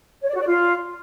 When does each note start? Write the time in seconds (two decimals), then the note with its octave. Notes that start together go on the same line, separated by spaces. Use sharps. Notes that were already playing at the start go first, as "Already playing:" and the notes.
0.22 C#5
0.28 D5
0.35 F#4
0.41 D5
0.47 F4